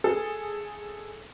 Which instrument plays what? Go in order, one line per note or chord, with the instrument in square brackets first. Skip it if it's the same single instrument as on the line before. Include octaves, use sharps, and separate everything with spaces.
[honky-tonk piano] G#4 A4